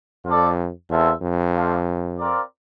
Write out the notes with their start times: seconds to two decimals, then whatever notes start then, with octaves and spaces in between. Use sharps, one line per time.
0.25 F2 F4 A4 D5
0.90 E2 C4 F4 A4 E5
1.22 F2
1.54 A3 D4 A4 C5 F5
2.18 C4 F4 A#4 D5